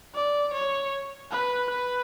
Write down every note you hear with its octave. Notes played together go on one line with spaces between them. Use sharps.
D5
C#5
B4
B4